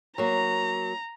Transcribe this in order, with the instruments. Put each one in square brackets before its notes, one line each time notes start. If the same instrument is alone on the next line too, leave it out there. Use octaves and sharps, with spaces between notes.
[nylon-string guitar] F#3 A#3 [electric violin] A#5